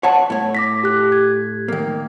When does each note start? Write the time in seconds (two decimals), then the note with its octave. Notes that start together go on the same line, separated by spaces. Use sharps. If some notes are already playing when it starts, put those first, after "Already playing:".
0.03 C#5 F#5 A5
0.30 A2 C#5
0.55 D6 A#6 B6
0.84 G4 F#6
1.12 G#6
1.68 D#3 A#3